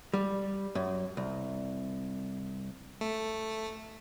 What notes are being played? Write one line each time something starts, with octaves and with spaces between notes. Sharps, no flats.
G3
F#2
C2
A3